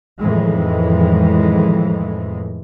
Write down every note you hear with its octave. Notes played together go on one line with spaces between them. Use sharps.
F2 A2 D#3 E3 G#3